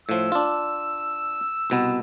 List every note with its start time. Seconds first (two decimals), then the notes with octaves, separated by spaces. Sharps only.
0.09 A2 F3 E6
0.32 D4 F4
1.70 C2 B2 B3